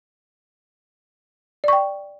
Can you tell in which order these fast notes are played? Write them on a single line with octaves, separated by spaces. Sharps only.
D5 C#6 G5